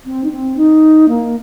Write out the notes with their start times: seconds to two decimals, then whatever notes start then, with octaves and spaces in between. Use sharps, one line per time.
0.06 C4
0.24 D#4
0.31 C4
0.57 D#4
1.09 A#3